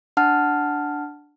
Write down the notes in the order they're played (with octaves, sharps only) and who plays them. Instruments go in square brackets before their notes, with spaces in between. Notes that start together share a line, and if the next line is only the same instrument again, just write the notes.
[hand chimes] D4 F#5 A5 F6